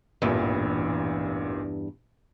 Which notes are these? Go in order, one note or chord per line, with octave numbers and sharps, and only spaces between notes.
A1 E2 G2 A#2